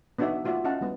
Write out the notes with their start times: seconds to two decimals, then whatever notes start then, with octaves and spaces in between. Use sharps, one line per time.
0.19 B3 D4 D#4 F#4 D5 E5
0.45 A3 F4 F#4 D5 E5
0.64 C#4 E4 D#5 F5 F#5 A5
0.81 G3 B3 E4